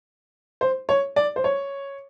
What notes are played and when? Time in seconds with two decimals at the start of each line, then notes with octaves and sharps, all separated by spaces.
0.61 C5
0.89 C#5
1.16 D5
1.36 C5
1.44 C#5